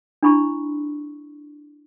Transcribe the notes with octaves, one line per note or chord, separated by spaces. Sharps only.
D4 E4 B5 C#6